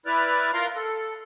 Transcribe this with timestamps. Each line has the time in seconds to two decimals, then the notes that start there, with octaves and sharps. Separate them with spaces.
0.06 E4 B4 D5 F6
0.54 F4 A#4 F5 A#5 C6
0.75 A4